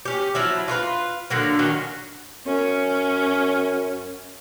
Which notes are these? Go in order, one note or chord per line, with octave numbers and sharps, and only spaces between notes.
C#4 G4
F3 F#3 E4
F4 F#4 B4
D3 F#3 A#3
D#3 F#3 C#4
F#2 C#4